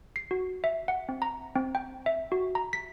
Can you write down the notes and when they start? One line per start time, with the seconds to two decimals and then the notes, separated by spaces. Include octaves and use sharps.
0.16 C7
0.31 F#4
0.64 E5
0.88 F#5
1.09 C4
1.22 A#5
1.56 C4
1.75 G5
2.06 E5
2.32 F#4
2.55 A#5
2.73 B6